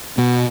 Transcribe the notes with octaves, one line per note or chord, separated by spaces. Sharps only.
B2